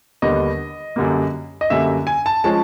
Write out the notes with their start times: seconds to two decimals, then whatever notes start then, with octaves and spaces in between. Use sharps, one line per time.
0.22 D#2 D3 G3 B3 D4 D#5
0.96 F#2 D3 G3 A#3
1.61 D#5
1.70 F#2 D3 G3 A#3 E5
2.07 G#5
2.26 A5
2.44 F3 G#3 C#4 A5